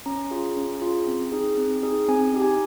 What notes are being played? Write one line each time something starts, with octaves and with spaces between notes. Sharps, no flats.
C#4 A#5
F4 G#4
C#4
F4 G#4
C4
D#4 G#4
C4
D#4 G#4
C4 G#5
D#4 G4
G#5